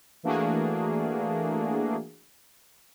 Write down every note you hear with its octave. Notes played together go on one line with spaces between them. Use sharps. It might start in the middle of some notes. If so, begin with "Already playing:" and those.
E3 A3 A#3 D4 F#4 G#4